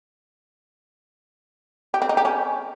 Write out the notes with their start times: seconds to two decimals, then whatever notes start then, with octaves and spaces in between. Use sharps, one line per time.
1.94 G4
2.02 C4
2.09 D#4
2.17 G4
2.25 C#4